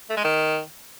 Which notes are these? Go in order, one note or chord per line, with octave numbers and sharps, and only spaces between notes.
A3
G#3
D#3